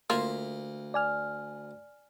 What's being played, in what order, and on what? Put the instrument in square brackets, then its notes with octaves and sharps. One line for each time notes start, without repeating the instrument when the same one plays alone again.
[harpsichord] D2 E5 F5 [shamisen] A#3 F4
[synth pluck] D5 G#5 F6